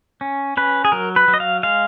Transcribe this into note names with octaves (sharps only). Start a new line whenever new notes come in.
C#4
C#4 B4
G#4
F#3 A#4
B4
F#3
D#5
F5
G#3 F5